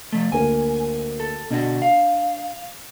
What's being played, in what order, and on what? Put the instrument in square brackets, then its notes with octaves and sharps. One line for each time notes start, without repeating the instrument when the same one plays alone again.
[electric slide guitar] F3 A3
[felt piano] D2 A#3 [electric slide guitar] G#5
[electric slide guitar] A4
[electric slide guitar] B2 D3 F#4 [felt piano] D4
[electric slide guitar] F5